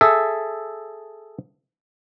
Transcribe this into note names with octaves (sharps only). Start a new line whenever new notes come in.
G#4 A4 E5